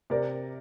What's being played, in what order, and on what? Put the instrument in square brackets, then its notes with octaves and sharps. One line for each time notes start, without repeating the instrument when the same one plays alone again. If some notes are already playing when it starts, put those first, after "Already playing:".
[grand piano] C3 A#4 D5